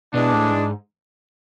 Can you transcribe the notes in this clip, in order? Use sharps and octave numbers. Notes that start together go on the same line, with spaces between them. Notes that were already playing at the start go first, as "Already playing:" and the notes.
B2 E3 G#3 D4
A2
G#2